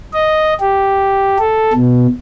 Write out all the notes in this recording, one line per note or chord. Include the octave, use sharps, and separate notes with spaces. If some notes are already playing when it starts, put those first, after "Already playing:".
D#5
G4
A4
B2